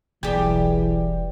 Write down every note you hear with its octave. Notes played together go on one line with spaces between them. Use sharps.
E1 B1 E3 G3 G4 G#4 G5